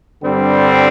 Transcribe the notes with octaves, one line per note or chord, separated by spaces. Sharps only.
G2 D3 G3 C4